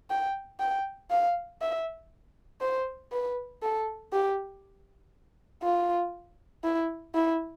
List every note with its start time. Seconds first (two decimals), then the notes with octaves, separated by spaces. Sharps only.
0.10 G5
0.60 G5
1.10 F5
1.61 E5
2.61 C5
3.12 B4
3.62 A4
4.12 G4
5.63 F4
6.64 E4
7.15 E4